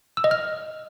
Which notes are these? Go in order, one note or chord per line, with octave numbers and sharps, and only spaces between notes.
E6
D#5
F6